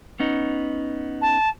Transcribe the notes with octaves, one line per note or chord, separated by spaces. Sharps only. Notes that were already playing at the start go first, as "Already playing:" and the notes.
B3 C#4 D#4
A5